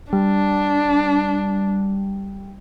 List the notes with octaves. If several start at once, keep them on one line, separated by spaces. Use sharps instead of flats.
G3 D4